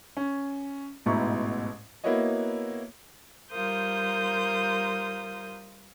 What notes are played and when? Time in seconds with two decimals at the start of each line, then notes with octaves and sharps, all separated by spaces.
0.17 C#4
1.06 A1 G#2 B2 E4 A#5 C#6
2.04 A#3 B3 E4 F#4 C#5 D#5
3.51 G3 F4 A#4 C5 D#6 G6